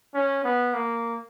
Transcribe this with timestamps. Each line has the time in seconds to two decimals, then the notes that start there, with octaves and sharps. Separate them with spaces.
0.14 C#4
0.44 B3
0.74 A#3